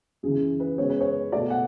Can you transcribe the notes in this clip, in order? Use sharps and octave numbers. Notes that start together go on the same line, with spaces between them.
F#2 C#3 E3 G#4
B4
F#2 C#3 G#3 B3 C#5
B4
C#5
B2 A3 D5
F#5